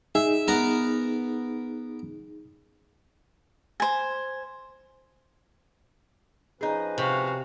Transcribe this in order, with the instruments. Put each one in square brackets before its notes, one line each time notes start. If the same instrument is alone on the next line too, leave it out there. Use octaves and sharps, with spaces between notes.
[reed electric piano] D#4 G#4 [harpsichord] E5
[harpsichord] B3 A#4
[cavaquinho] C5 G#5
[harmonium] F3 C#4 B4 [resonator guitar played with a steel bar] D#4 G#4
[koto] C3 [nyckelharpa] F#4 F5